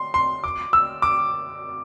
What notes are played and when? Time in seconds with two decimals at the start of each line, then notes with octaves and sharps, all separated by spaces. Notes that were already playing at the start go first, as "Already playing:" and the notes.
Already playing: C6
0.14 C6
0.44 D6
0.73 E6
1.02 D6